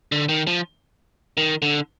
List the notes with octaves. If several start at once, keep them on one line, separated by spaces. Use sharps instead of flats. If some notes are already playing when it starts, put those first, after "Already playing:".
D3
D#3
F3
D#3
D3